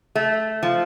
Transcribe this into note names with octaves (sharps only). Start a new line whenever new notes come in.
A3
F3